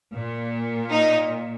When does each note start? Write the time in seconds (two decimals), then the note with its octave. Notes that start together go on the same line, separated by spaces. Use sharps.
0.14 A#2
0.90 D#4